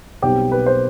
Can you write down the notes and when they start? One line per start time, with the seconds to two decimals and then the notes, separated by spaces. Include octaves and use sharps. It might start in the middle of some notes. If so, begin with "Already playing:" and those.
0.22 B1 B2 G3 C4 G4
0.52 B4
0.66 C5